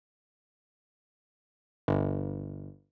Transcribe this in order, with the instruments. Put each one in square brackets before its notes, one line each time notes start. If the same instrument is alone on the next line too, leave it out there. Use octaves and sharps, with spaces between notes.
[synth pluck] G1